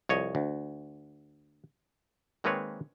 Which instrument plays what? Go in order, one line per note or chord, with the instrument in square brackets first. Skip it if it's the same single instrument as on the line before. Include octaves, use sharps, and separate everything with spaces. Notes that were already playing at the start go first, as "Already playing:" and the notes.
[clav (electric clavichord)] C2 F2 C#5 D#5
D2
D#3 G#3 A#3 C4 B4 C#5